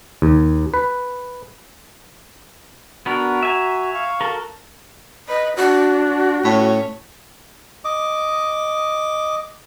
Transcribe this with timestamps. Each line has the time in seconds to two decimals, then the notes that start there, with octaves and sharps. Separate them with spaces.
0.22 D#2
0.74 B4
3.06 B3 D4 F#4 A#4
3.43 E5 G#5 A#5
3.95 F5 C#6
4.21 F#4 A4 A#4
5.28 B4 D#5
5.57 D4 F#4
6.44 A2 C#4 C#5
7.85 D#5 D6